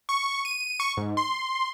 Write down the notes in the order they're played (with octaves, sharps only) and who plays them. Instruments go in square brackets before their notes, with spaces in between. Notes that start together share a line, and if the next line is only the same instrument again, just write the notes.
[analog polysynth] C#6
D#7
C#6
G#2
C6